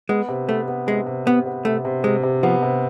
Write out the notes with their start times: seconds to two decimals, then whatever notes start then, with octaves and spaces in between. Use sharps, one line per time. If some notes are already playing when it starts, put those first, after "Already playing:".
0.09 G#3 B3
0.28 C3
0.49 A3 B3
0.68 B3
0.87 C3 G#3
1.07 C3
1.26 C3 B3
1.46 B3
1.65 C3 A3
1.85 C3
2.04 C3 G#3
2.23 C3
2.43 F3 B3
2.63 C3